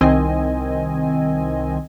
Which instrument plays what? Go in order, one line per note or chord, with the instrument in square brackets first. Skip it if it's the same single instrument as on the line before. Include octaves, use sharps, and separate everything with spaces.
[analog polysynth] C2 D#3 C4 D#5 G#5